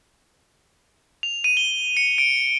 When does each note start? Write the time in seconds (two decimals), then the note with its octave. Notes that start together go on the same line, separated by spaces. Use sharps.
1.23 F7
1.44 D#7
1.57 G7
1.97 C#7
2.18 D7